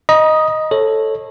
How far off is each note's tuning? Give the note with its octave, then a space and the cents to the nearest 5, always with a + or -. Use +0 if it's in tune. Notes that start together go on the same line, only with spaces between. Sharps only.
D#5 +0 A#5 +40
A4 +0 C#5 -20